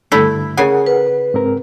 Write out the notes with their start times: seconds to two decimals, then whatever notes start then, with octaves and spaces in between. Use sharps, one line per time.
0.12 G2 D3 A3 E4
0.57 C#3 G#4 A#4 F#5 G#5
0.86 B4
1.34 G#2 C4 A#4